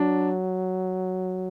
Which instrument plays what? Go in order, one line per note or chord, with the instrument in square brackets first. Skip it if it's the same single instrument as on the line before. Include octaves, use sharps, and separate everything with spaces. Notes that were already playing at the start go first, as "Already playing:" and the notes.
Already playing: [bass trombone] F#3 [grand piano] D4